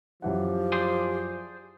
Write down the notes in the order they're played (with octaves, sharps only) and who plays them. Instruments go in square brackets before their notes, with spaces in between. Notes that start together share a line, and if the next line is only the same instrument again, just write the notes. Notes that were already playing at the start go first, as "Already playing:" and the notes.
[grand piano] F#2 E3 F#5 [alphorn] F3 [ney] G4
[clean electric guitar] G#4 C5 D5